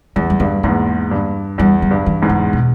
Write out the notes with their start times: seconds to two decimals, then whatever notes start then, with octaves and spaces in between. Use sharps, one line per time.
0.16 E2 G#3
0.30 G3
0.40 G2 G#3
0.63 E2 G#2 A#3
1.11 G2
1.58 E2 G3
1.82 G3
1.91 G2
2.06 E3
2.22 E2 G#2
2.29 C#3
2.53 B2